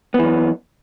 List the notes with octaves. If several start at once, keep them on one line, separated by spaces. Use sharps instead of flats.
F#2 E3 B3